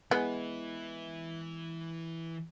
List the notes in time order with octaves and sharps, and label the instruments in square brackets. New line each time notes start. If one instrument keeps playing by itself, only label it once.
[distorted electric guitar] E3 E4 [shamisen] G#3 B3